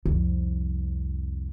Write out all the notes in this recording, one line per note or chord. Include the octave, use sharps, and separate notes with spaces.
C2 F2